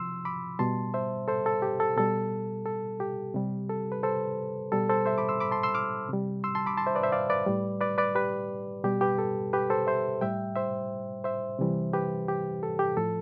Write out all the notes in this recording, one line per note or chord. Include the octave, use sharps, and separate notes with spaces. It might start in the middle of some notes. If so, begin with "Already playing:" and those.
Already playing: C3 F3 C6 E6
B5 D6
B2 G3 A5 C6
C5 E5
A4 C5
A4
G4
A4
B2 G3 A4
A4
G4
C3 G3
A4
B4
A4 C5
B2 G3 A4
A4 C5
C5 E5
B5 D6
C6 E6
B5 D6
A5 C6
C6 E6
D6 F6
C3 G3
C6 E6
A5 C6
B5 D6
A5 C6
C5 E5
B4 D5
C5 E5
D5 F5
B4 D5
A2 G3
B4 D5
B4 D5
G4 B4
B2 G3 G4
G4 B4
A4
G4 B4
A4 C5
C5 E5
A2 G3 E5 G5
C5 E5
C5 E5
C3 E3 G3
G4 B4
G4
A4
G4
A2 F3 A4